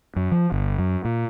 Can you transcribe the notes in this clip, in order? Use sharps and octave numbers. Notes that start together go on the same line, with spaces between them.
F#2
F3
G1
F#2
A#2